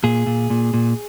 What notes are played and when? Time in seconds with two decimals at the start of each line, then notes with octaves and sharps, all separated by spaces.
0.04 A#2 G#4
0.27 A#2
0.50 A#2
0.74 A#2